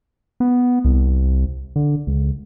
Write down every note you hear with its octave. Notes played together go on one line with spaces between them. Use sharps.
B3
C2
D3
C#2